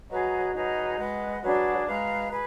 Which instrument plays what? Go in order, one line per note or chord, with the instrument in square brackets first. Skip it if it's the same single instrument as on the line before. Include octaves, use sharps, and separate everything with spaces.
[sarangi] F#3 [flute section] G#4 B4 D#5 A#5
[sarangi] F#3 [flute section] D#4 G#4 B4 D#5
[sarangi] G#3 [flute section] B4 D#5 F#5
[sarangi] F#3 [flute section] D4 G#4 B4
[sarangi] G#3 [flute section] B4 F5 A#5
[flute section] G#4 B4